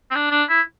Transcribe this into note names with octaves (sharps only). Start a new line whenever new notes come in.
C4
D4
D4
E4